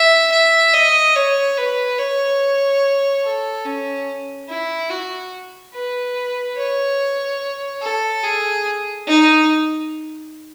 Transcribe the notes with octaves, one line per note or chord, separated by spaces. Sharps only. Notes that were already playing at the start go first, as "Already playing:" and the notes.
Already playing: E5
E5
D#5
C#5
B4
C#5
A4
C#4
E4
F#4
B4
C#5
A4
G#4
D#4